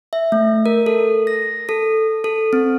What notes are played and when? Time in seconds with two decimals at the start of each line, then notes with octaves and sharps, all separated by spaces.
0.13 E5
0.32 A3
0.66 A#4
0.86 A4
1.27 A#6
1.69 A4
2.24 A4
2.53 C4